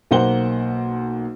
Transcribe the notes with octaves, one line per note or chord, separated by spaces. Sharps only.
B1 A#3 C5 F#5 G7